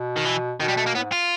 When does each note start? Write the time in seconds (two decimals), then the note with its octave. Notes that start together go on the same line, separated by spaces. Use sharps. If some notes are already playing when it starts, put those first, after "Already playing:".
Already playing: B2
0.16 D#3
0.25 E3
0.60 B2 D#3
0.68 G3
0.77 A3
0.86 A#3
0.95 A2 B3
1.04 G#2
1.12 F4